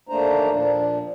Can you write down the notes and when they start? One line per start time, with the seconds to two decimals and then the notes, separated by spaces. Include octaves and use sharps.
0.09 D#2 A3 A#3 D4 C5 A#5
0.50 A#2 F3 D4